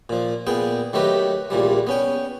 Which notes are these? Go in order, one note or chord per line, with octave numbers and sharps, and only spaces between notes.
A#2 F3
A#2 B3 G#4 G5
D#3 F#3 A3 G4 B4
A#1 A#2 E3 G3
B3 C#4 G5